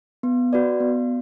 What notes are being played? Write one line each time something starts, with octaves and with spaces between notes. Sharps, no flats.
B3
F#4 B4 D5
B3